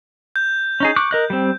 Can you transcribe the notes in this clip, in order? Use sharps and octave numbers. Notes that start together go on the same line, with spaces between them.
G6
C#4 D#4 G#4
C#6 D6 F#6
A#4 D#5 F#6
G3 C4